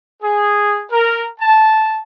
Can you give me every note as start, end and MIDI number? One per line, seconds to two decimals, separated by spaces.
0.23 0.82 68
0.91 1.26 70
1.40 1.98 81